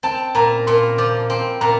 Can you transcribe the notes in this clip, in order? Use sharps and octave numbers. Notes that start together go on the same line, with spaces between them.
C4 A5
A#2 A#5
A#2 C6
F3 D6
C4 C6
A#2 A#5